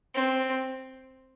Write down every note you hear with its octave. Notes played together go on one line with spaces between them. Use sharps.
C4